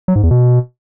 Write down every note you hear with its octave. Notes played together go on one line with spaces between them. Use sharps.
F#3
G#2
E2
B2